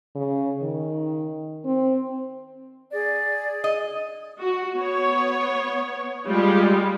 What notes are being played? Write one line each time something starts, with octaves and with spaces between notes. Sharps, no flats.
C#3
D#3
C4
G#4 D5
D#5
F#4
B3 C#5
G3 G#3 F4 G4